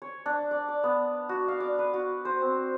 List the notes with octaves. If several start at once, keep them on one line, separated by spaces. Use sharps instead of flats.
C#5
D4
D5
D5
B3
F#4
F5
D5
B4
F#4
C5
C4